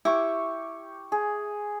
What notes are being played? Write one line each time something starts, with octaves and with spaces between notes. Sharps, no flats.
E4 G4 C#6 D6
G#4